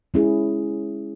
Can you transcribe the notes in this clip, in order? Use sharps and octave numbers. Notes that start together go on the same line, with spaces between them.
G#3 C#4 E4 G#4